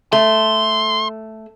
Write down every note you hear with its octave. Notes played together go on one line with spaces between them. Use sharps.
A3 C6